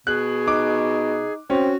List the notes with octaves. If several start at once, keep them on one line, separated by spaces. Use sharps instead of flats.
B2 G#4 F#6
D#4 D6
C4 C#4 F#4